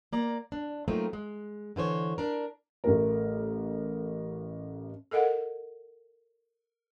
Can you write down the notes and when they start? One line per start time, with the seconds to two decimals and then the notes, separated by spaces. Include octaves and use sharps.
0.13 A#3 D5 A#5
0.52 D4
0.88 F#3 A3 A#3 C4 D#4 F4
1.13 G#3
1.76 D3 E3 C5 C#5
2.18 D4 A#4
2.84 A1 A3 A#4
5.11 A4 A#4 D#5 F5 F#5